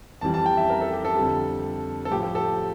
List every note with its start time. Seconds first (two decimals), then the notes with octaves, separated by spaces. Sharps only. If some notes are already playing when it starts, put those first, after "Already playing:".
0.21 F2 E3 G3 A5
0.34 A5
0.46 G5
0.57 E5
0.69 A#4
0.81 A4
0.93 G4
1.05 A4
1.17 F2 D3 G3
2.05 A4
2.11 A2 F3 G4
2.23 G4
2.35 A4